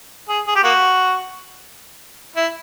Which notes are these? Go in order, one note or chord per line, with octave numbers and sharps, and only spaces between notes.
G#4
G#4
G4
A#3 F#4
E4